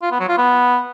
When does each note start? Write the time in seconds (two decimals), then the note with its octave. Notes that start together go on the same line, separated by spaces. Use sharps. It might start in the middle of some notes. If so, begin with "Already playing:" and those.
0.02 F4
0.11 B3
0.20 F#3
0.29 F4
0.38 B3